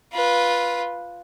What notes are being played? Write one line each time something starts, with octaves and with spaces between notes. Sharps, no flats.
F4 B4